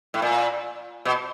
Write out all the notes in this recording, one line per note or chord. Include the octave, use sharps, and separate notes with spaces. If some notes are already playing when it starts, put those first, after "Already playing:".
A2
A#2
B2